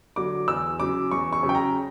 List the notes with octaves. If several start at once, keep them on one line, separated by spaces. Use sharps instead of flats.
D3 F#3 D6
E2 E6
C#3 F#3 D6
E2 C#6
C#6
C#3 F#3
G5
A#5